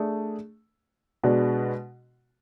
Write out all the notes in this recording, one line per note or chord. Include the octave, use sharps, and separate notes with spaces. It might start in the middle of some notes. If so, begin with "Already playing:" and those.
Already playing: A3 D4 G#4
B2 G#3 D4 F#4